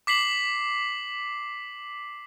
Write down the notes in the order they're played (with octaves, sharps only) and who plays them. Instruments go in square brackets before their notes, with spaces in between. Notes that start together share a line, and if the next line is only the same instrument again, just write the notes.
[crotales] D6 B6 C7 F#7